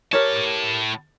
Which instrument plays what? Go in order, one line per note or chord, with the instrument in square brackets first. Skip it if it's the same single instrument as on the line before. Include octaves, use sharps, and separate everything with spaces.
[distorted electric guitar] A2 A5 [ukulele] G4 A#4 C#5